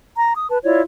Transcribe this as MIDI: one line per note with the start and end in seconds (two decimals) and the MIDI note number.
0.17 0.32 82
0.35 0.47 87
0.50 0.58 71
0.50 0.58 81
0.64 0.81 64
0.64 0.81 65
0.64 0.81 73
0.64 0.81 74